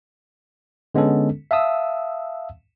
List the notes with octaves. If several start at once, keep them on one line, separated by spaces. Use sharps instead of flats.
D3 G#3 B3 C#4 A4
E5 F5 A5 D#6 E6